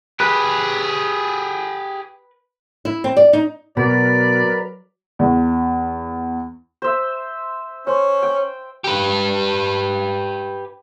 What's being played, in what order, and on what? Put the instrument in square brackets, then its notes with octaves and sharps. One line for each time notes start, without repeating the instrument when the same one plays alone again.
[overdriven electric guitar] G4 G#4 [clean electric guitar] B4
[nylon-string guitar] E4
C4
D5
D#4
[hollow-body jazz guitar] B2 [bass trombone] F#3 [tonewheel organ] A#4 B4 [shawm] D5
[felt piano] E2
[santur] C5 E5
[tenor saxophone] C#4 [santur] C5
[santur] G5
[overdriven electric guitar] G4 B4